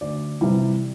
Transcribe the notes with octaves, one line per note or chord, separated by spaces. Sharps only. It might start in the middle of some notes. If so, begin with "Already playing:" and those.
D2 D5
C3 E3 G3